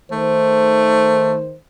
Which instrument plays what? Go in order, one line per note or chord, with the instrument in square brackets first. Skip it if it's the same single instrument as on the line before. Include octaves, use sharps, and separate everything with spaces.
[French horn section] D#3 C5 [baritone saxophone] A3